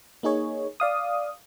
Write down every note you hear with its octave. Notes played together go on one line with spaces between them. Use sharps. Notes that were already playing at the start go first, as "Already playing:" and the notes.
A#3 D#4 G#4 C#5
D5 F5 D#6